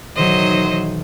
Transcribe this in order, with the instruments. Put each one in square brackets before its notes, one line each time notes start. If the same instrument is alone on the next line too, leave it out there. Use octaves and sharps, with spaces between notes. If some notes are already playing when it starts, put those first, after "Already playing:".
[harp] B1 D#3 E3 [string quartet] F#3 C5 D#5